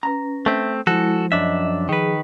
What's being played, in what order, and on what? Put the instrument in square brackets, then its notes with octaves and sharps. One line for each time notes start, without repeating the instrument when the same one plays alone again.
[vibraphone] C#4 B4 [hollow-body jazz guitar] A#5
[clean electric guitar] A3 C4 [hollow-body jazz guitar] E5
[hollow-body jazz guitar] F3 [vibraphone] G#3 E4 [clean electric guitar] F#4 A4
[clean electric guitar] F#2 D4 E5 [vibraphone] D#5
[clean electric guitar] D#3 B4 [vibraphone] G#4